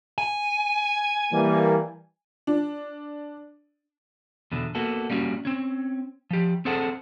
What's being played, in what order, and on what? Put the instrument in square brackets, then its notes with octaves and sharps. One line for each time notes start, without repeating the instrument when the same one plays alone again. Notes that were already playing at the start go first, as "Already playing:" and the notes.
[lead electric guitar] G#5
[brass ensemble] E3 G3 A#3
[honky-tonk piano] D4
[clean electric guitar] E2 B2 D3
A#3 B3 F#4 A4
G3 A#3 C#4 D#4 F#4
C4 C#4
F3 G4
C4 G#4 A4 C5 F#5 A5